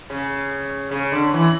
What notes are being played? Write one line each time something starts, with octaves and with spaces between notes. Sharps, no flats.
C#3
C#3
D3
E3